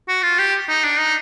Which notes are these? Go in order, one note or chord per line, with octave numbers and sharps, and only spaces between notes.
F#4
F4
G4
D#4
D4
D#4